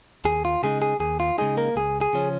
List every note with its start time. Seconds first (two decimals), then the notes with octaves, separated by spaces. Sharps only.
0.25 D#2 G#4
0.45 F4
0.63 C#3 G#3 D#4 G#4
0.82 G#4
1.00 D#2 G#4
1.20 F4
1.38 C#3 G#3 D#4 G#4
1.57 A#3 A#4
1.76 C#2 G#4
2.01 G#4
2.13 C#3 F3 C#4